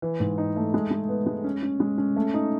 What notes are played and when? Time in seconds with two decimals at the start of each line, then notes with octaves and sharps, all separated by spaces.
0.02 E3
0.20 G#2
0.38 D#4
0.56 A3
0.74 G#3
0.91 G#3
1.09 B3
1.26 G#3
1.44 C#4
1.62 C#4
1.80 G#3
1.98 C#4
2.16 A3
2.34 D#4